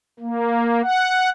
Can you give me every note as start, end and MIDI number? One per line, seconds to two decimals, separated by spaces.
0.20 0.82 58
0.82 1.29 78